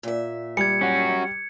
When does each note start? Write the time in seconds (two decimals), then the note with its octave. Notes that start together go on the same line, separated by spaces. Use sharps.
0.03 A#2 E5
0.57 G3 G#6 C#7
0.81 C#4 F#4